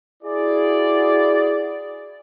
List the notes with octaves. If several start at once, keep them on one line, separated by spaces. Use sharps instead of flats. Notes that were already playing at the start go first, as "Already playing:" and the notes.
E4 F#4 G#4 D5